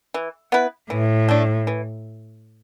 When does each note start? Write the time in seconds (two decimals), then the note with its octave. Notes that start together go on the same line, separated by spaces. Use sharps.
0.14 E3
0.52 B3 E4 B4
0.90 A2 E3
1.28 A3 D4
1.67 E3